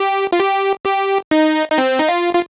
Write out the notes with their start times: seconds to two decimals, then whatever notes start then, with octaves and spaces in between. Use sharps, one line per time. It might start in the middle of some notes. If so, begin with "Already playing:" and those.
Already playing: G4
0.32 F4
0.40 G4
0.85 G4
1.31 D#4
1.70 D#4
1.78 C4
1.99 D#4
2.08 F4
2.35 F4